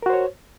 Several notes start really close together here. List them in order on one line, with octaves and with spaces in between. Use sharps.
A#4 F#4 C5 C#5